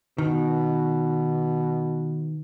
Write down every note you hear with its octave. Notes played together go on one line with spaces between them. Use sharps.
B2 D#3